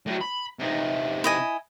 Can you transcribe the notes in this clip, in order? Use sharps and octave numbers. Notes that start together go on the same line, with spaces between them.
A2 F#3
B5
C3 D#4
E4 D#5 G#5